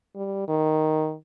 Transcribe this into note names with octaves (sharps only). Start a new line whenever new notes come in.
G3
D#3